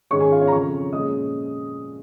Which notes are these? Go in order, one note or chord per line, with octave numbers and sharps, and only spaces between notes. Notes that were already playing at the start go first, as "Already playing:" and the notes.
G#2 D#3 G#3 C#4 C#5 C#6
G#4 G#5
F4 F5
C#4 C#5
A#5
F2 C#3 F3 C#4 C#5 C#6
A#2 G#3 C#4 D#5 D#6